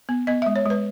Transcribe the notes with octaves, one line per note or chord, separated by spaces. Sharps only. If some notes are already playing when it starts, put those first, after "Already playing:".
B3
B3 D#5
G#3 E5
C#5
G#3 B4